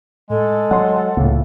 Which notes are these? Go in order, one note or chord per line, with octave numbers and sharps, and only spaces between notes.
A2 G#3 A4
F#3 F#5 C6
F#5
C#2 A2 C#3 A#3